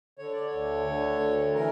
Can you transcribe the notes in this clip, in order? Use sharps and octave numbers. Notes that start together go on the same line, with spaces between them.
D3 C#5
D5
C#5
D2
D3
D2
E3 A#4